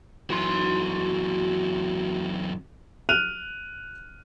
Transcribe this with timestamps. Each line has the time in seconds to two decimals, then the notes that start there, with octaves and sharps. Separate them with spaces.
0.30 F#2 E3 F#4 C6
3.09 F6 F#6 D#7 F7